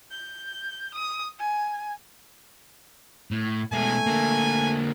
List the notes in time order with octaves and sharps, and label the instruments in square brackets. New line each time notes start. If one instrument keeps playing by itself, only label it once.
[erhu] G6
D#6
G#5
[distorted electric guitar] A2
[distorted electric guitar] B2 G#3 [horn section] A3 G#5
[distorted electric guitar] D3 A#3